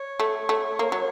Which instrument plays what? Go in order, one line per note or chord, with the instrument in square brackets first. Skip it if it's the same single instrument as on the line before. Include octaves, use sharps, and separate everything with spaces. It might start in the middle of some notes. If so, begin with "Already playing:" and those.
Already playing: [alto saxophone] C#5
[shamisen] A3
A3
A#3
F#3